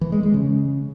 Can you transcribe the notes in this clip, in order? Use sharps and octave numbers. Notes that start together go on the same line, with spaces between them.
E3
G#3
G#3
C#3